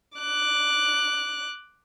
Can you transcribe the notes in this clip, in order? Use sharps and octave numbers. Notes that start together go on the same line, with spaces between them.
D6 F#6